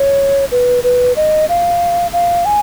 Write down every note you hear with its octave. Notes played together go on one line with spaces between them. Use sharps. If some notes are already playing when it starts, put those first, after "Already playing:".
Already playing: C#5
B4
B4
D#5
F5
F5
G#5